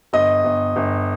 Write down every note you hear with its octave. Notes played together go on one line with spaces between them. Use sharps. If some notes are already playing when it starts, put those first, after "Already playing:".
G1 D#5
G1
G1